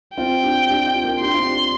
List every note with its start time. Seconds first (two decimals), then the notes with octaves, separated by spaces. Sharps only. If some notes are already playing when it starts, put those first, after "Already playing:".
0.17 C4 F4 G5
0.43 D4 G4
0.70 D4 G4
0.87 C4 F4
1.04 A#3 D4
1.21 D4 G4 C6
1.34 C4 F4
1.47 D4 G4